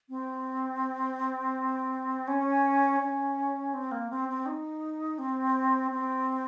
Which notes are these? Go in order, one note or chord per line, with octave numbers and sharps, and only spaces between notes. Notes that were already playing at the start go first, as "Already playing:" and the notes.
C4
C#4
C#4
C4
A#3
C4
C4
D#4
C4
C4